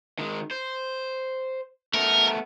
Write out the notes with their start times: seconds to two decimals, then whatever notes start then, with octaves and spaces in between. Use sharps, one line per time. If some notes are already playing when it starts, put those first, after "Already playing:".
0.19 D#3 G#3
0.51 C5
1.94 A3 B3 A#4